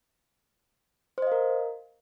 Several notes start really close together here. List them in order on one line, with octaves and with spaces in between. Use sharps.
C5 D#5 F5 A#4